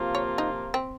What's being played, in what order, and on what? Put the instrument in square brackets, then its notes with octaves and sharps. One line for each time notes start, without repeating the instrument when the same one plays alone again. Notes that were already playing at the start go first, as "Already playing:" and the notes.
Already playing: [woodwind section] C3 F3 A#3 F4
[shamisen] C#5
D#4
C4